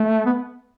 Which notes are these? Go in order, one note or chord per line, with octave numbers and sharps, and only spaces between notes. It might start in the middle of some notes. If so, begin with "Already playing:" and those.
Already playing: A3
B3